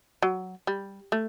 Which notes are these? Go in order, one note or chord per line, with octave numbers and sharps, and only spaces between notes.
F#3
G3
A3